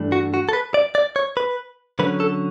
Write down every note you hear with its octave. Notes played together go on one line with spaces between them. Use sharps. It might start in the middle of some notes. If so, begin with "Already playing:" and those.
Already playing: G2 E3 A3 D4
F#4
F#4
A4
B4
D5
D5
C#5
B4
D3 F#3 C#4 B4
A4